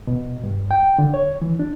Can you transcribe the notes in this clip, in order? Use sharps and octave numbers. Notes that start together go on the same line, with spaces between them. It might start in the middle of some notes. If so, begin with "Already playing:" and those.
B2
G2
G5
D3
C#5
E3
D4